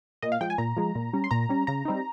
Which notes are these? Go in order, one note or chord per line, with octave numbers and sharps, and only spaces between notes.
A#2 D#5
F5
F3 G#3 G5
G#5
A#2 A#5
F3 G#3
A#2
G3 C#4
C6
A#2 A#5
G3 C#4
C#3 A#5
G3 C4 D#4